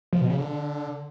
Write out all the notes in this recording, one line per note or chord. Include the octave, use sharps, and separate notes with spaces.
F3
B2
C#3
D3